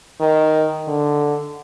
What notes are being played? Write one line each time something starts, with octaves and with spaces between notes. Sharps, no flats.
D#3
D3